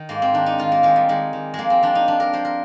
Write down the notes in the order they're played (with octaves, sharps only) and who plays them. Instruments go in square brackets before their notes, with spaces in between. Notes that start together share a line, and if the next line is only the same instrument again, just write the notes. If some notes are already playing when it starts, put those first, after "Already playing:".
Already playing: [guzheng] D#3
G#2 A#3
C4
D#3 D4
D#4
D#3 F4
A#3
D#3 G#3
G3
D#3 G#3
D#3
F3 G#3 A#3
C4
F3 D4
D#4
F3 D4
A#4
F3 C5
A#4